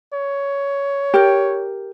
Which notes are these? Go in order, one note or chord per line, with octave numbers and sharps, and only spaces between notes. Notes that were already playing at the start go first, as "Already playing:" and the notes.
C#5
G4 A#4